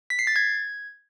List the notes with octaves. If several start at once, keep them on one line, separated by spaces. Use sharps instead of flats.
B6
C7
A6
G#6